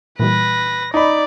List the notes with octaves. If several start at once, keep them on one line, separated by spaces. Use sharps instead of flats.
A#2 E3 G3 B4 A#6
D#4 D5 B5